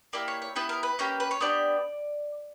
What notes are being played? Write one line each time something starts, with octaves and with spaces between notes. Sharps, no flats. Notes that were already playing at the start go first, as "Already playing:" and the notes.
A#3 E4 G4 D5
C#5
C#5
B3 E4 G4 B4
A#4
B4
A#3 C#4 G4
B4
C#5
B3 D4 G4 D5